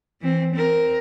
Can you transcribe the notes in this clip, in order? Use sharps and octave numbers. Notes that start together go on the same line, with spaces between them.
E3 C4
C4 A#4